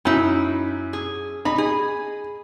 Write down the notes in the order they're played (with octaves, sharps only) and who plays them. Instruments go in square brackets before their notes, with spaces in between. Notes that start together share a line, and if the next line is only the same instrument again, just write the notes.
[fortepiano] F#2 [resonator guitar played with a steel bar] D#4 E4
[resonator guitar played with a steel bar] G#4
[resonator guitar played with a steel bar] D#4 [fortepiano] B5
[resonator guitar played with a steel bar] G#4